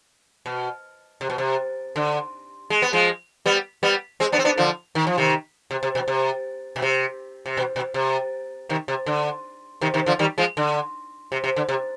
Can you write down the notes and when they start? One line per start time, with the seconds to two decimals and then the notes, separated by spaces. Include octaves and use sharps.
0.46 B2
1.21 C3
1.30 B2
1.38 C3
1.96 D3
2.70 G#3
2.82 B3
2.93 F3 G#3
3.46 G3 B3
3.83 G3 B3
4.20 G#3 C4
4.32 B3 D4
4.39 C4
4.45 B3 D4
4.58 D3 F3
4.95 D#3
5.07 F3
5.18 C3 D#3
5.71 C3
5.83 C3
5.95 B2
6.08 C3
6.76 B2
6.82 C3
7.46 C3
7.57 B2
7.76 B2
7.94 C3
8.69 C3 D#3
8.88 C3
9.06 D3
9.81 C3 D#3
9.94 C3 D#3
10.06 D3 F3
10.19 D#3 G3
10.38 F3 G#3
10.57 D3
11.32 C3
11.44 C3
11.56 D3
11.69 C3